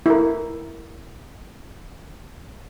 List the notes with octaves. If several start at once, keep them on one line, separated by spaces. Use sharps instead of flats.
E4 A#4